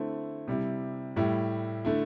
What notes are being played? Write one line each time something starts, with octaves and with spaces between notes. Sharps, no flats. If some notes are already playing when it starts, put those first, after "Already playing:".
Already playing: D3 A3 C4 E4
C3 G3 E4
A2 G3 E4
D3 A3 E4